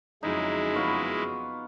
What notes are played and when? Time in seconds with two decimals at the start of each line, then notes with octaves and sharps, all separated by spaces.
0.23 F2 C#3 F#3 G#3 D#4 E4
0.76 B3 F4 F#4